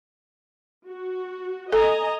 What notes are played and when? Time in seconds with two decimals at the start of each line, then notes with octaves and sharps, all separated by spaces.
0.87 F#4
1.72 A4 D#5 G#5 A#5